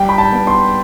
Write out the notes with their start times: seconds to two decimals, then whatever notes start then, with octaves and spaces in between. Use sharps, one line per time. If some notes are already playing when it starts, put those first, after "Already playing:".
Already playing: G3 G5
0.09 B5
0.18 A5
0.32 B3
0.47 C6